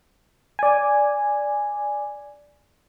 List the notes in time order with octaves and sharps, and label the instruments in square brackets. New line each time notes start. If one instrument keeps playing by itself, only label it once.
[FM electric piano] D5 G#5